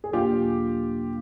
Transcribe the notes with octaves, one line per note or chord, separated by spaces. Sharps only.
G#4
E2 B2 F#3 A#3 D4 F4 G4